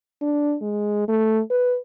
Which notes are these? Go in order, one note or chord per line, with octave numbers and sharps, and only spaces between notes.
D4
G#3
A3
B4